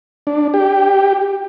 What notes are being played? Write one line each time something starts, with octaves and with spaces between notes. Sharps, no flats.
D4
G4